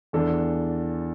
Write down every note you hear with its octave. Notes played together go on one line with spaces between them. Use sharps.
E2 E3 D4 A4